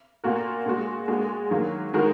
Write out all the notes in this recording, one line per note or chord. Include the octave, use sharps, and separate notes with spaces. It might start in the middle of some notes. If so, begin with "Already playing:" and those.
A#2 A#3 F#4 A#4
A#2 G#3 F#4
A#2 G#3 F#4
D#3 F#3 A#3
D#3 G#3 F#4 A#4